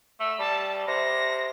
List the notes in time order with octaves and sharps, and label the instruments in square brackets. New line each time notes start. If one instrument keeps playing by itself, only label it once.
[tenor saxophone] A3 [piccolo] E6
[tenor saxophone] G3 [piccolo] A5
[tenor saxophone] C3 [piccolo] A#6